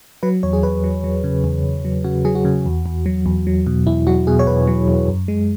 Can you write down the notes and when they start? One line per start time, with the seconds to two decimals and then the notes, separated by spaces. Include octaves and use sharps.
0.23 F#3 B4
0.43 E2 C#5
0.53 G#4
0.63 E2 B4
0.84 F#3
1.04 F#3
1.24 C#3
1.44 E2
1.64 E2
1.85 F#3
2.04 C#3 F#4
2.25 F#3 G#4
2.35 F#4
2.45 C#3
2.66 E2
2.86 E2
3.06 F#3
3.26 E2
3.47 F#3
3.67 B2
3.87 E2 E4
4.07 F#3 F#4
4.27 B2 G#4
4.39 C#5
4.47 E2 B4
4.67 F#3
4.88 E2
5.08 F#2
5.28 G#3